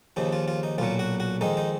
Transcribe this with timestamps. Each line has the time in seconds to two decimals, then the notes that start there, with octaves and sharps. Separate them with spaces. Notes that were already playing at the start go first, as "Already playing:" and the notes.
0.16 D#2 C#3 F3 D#4
0.33 F4
0.48 F4
0.63 D#4
0.78 B1 A#2 F#3 F4
0.99 F#4
1.20 F#4
1.41 F2 D#3 G#3 D#4
1.57 D#4